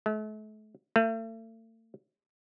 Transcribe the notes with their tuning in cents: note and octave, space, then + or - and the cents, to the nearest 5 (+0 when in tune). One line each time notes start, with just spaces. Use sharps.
A3 -40
A3 +40